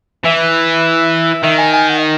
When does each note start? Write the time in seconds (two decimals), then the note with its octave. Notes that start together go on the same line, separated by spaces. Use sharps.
0.24 E3 E5
1.44 D#3 E5
1.58 G#5
1.74 G#5
1.89 F#5
1.99 D#5